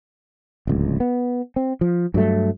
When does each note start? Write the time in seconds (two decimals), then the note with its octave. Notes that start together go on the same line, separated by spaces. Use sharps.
0.67 D1 C#2
1.00 B3
1.56 C4
1.81 F3
2.14 G2 F#3 A3